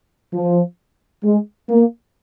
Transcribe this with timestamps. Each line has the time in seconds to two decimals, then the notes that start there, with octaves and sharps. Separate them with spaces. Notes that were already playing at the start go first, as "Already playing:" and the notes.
0.34 F3
1.24 G#3
1.69 A#3